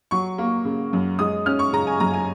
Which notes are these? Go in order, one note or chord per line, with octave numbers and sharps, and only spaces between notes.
F#3 C#6
A#3
C#3
F#2
G#3 D#6
C#4 F6
C#6
C#3 A#5
G#5
F#2 A#5
G#5